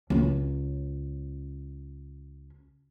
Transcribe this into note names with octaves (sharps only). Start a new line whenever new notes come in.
C#2 C#4